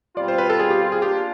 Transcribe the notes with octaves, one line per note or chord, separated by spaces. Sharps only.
B2 G3 C4 F4 D5
C5
B4
A4
G#4
G4
G#4
A#3 D4 F4 G4